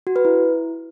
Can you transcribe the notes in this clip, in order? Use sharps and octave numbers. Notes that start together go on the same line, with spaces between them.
F#4
B4
E4